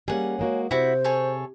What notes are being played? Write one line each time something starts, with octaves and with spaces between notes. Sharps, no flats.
G3 A#3 C#4 G#4 F#5
G#3 A#3 F#4 C#5
C3 E4 F#4 C5 E5
G#4 A4 C#5